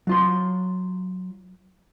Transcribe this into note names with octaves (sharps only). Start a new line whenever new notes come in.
F#3 F4 C6